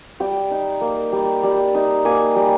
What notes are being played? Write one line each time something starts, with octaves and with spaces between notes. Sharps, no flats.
G3 G5
D#4
A#3
G3
G3
D#4
A#3 G#5
G3